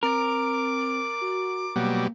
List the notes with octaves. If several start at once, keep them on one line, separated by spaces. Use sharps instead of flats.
C4 A#4 D6
F#4
B2 F#3 G3 A#3